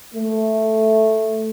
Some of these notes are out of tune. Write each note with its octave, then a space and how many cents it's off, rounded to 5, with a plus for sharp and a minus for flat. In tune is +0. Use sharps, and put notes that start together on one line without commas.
A3 +0